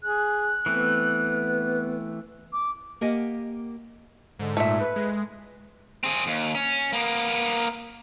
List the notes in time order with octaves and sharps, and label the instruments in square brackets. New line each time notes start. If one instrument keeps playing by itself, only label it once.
[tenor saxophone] G#4 [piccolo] F#6
[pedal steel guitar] E3 A3 C4 [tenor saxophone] B3
[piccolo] D6
[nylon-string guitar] A#3 G4 A#4 D#5 F#5 G#5
[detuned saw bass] G#2 [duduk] D3
[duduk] A#2 [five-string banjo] A3 E5
[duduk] B4
[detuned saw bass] G#3
[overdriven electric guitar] C4 G#4
D#2
C#4
A#3 B3